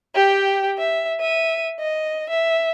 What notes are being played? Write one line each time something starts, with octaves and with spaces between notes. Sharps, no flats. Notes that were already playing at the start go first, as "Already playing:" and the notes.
G4 G5
E5
E5 D#7
D#5
E5